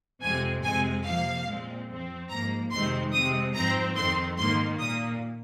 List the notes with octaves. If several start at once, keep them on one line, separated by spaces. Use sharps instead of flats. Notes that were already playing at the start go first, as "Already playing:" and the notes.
F2 C3 G#3 C4 G#5
F2 C3 G#3 C4 G#5
C3 F3 A#3 F5
A#2 G#3 C4
F2 F3 C4
G#2 F3 A#3 A#5
F2 C3 D#3 G#3 C4 C6
C3 G#3 C4 D#6
G#2 F3 C4 A#5
F2 D#3 C4 C6
G#2 D#3 A#3 C6
A#2 A#3 D#6